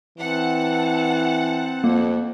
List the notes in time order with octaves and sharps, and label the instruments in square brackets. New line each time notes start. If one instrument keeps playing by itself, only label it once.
[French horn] E3 [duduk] C4 [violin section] F#5 A5
[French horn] F2 [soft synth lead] A#3